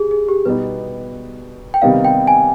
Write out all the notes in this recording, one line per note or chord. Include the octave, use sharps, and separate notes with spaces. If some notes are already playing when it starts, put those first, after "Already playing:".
Already playing: G4 G#4
G#4
G4
B2 G3 B3 D#4 B4
G5
C3 D#3 G3 B3 D#4 F5
G5
G#5